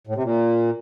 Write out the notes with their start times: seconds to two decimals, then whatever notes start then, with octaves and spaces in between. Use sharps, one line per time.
0.07 A2
0.15 C3
0.23 A#2